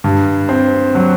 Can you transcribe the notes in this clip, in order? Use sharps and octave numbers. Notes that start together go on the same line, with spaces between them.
G2
C4
F#3